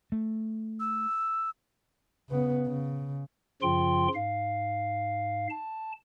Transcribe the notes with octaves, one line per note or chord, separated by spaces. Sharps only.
A3
E6
C#3 B3
C#3
F#2 C#3 F3 F4 G5 C6
G#2 F5
A5